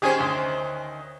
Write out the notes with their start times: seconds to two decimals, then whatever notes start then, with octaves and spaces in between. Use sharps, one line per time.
0.02 D#3 C#4 G4 G#4 C5 G#5
0.20 D2